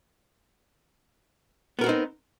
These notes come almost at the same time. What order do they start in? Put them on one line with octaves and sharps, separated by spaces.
B3 A#4 F#4 C4 D#4